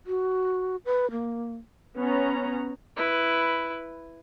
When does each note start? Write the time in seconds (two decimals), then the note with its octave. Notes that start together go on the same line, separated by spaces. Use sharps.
0.07 F#4
0.85 B4
1.11 A#3
1.97 B3 C#4 A#5
2.96 E4 B4